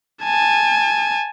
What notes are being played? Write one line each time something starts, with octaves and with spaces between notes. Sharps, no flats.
G#5 A5